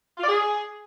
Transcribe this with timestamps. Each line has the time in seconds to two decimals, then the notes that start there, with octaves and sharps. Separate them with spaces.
0.18 F4
0.23 D5
0.28 G#4